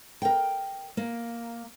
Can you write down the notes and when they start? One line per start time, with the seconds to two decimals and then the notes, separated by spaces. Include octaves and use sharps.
0.22 A#4 G5
0.97 A#3